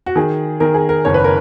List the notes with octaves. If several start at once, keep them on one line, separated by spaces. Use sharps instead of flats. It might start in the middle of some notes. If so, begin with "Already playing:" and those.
F#4
D#3 G#4
D#3 A#4
G#4
A#4
F#1 C#5
B4
A#4